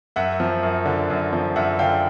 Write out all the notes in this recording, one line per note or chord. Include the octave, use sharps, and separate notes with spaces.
F#2 E5 F#5
F3
F#2
D3
F#2
F3
F#2 E5 F#5
D3 F5 G5